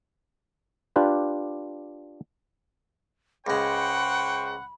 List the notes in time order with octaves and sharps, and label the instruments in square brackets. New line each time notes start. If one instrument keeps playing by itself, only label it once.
[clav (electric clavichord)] D4 F4 G4 B4
[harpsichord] C#2 G#3 [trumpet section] C5 G5 C#6 [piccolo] F#5 [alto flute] B5